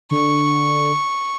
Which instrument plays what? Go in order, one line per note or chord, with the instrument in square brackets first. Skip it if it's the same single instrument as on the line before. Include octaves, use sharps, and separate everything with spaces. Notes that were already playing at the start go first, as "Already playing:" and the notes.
[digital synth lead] D3 [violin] C#6